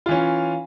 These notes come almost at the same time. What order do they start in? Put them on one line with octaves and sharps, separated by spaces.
F4 E3 C#4